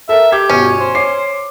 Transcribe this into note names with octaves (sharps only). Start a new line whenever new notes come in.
A4 A#4 E5
G4 G#6
G1 B2 C#4
C5
C#5 D6 C7